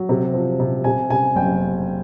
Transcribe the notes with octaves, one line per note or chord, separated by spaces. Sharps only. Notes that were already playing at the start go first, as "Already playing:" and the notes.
Already playing: F#3
C3
F3
C3
C3 G#5
C3 G#5
F#1 G5